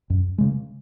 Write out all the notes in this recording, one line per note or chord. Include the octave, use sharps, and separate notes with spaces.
F#2
C#3 G#3